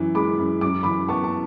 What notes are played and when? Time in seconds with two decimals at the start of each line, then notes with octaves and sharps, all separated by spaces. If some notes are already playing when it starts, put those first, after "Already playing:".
Already playing: F#2 E3
0.15 G#3 B5 D6
0.38 F#2
0.61 F#2 D6
0.83 E3 B5 D6
1.09 B3 A5 C#6
1.23 A5 C#6